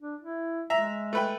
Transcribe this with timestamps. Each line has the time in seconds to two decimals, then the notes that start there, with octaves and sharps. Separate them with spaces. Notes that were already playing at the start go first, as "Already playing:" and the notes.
0.02 D4
0.21 E4
0.70 G#3 E5 A#5
1.13 A3 B4 G5